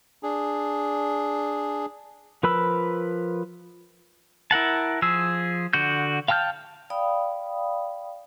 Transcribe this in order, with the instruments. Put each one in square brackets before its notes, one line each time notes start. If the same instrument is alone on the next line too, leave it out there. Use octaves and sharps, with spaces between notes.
[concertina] D4 G#4
[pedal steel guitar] F3 A#4 B4 B5 E6
E4 A#4 F#5 A5
F3 G#4 E6
D3 F#4 G6
F5 G5 A5 F6 G6
[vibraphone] D5 F5 G5 B5 D#6